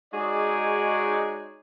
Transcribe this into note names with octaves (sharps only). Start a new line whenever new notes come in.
G#3 D#4 F#4 G#4 C#5 D5